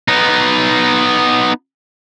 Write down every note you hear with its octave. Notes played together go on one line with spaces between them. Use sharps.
B3 D#4